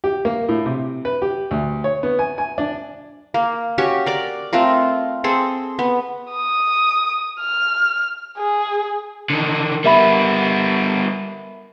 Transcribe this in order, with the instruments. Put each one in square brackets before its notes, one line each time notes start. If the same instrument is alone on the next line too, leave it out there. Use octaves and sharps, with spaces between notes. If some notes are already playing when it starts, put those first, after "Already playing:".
[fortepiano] G4
A#3
A2
C3
B4
G4
D2
C#5
B3
G#5
G#5
D4
[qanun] A#3
C#4 F#4 G4 C#6
A#4 D5 D6
A3 C4 F4 A#4
C4 G#4 A4
B3
[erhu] D#6
F6
G#4
[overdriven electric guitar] D3 D#3
[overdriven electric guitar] G3 B3 [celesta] A#4 E5 B5